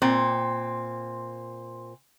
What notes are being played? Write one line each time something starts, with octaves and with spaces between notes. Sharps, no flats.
A#2 C4